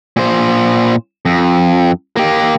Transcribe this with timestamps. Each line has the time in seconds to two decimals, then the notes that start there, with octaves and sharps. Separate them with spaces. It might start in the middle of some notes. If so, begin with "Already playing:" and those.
0.16 A#2 C5
1.25 F2
2.16 A#3 G4